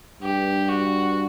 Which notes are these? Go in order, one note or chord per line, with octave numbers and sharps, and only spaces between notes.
G2 G4
F#4